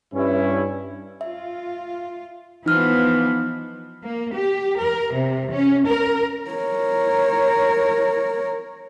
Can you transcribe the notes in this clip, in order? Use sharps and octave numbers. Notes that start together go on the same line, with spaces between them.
G2 C#4 E4
F4 E5
E3 F3 B3 D#4 F6
A#3
G4
A#4
C3
C#4
A#4
A#4 C#5